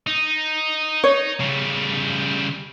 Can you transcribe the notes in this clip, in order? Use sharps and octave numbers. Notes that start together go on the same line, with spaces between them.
D#4
C#5
C#3 G3